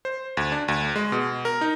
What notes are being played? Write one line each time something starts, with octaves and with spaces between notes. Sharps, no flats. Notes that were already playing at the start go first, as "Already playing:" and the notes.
C5
D2
D4
D2
G#3
B2
A#4
D#4